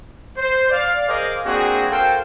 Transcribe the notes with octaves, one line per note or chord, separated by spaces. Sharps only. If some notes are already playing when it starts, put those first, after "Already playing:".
C5
D5 F5
G#4 A#4 C5 D#5 F5 D6
A#3 C4 D4 F#4 G#4
F#4 A4 A#4 C5 F5 G5